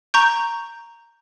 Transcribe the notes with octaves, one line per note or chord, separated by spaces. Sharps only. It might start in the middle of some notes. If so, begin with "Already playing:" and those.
A#5 C#6 G6